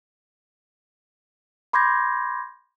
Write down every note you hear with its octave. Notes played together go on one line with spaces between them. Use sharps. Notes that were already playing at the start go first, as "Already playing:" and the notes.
B5 C6 D6 G6 G#6 A#6